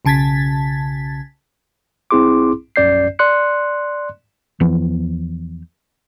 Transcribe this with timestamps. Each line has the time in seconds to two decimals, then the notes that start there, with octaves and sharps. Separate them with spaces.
0.05 B1 C#3 A5 G#6 A6 B6
2.11 B1 C4 E4 G#4 C6 D6
2.76 A#1 F#2 C#4 D5 G6 C7
3.19 D5 C6 F#6 C#7
4.60 E2 E3 F3 B3